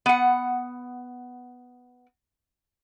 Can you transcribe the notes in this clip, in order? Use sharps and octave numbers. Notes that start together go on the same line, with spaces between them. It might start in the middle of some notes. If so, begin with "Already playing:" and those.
B3 F#5